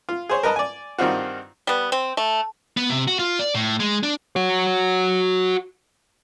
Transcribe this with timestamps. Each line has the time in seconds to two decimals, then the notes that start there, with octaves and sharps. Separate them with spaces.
0.09 F4
0.29 G#4 C5 C#5
0.43 A#4 B4 D#5 A5 A#5
0.56 D5 G#5
0.98 G2 D#3 C4 D#4 F4 F#4
1.67 G3 B3
1.92 C4
2.17 A3
2.77 B3
2.90 C3
3.08 F#4
3.19 F4
3.39 D5
3.55 A2
3.80 G#3
4.03 D4
4.36 F#4 C#5